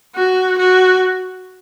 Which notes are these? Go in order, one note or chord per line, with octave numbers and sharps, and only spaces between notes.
F#4
F#4